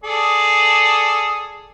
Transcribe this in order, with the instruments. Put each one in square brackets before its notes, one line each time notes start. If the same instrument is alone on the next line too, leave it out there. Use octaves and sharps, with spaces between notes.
[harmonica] G#4 A4 D5